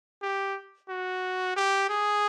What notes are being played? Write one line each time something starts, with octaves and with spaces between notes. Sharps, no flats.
G4
F#4
G4
G#4